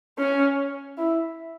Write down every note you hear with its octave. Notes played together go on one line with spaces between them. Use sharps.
C#4
E4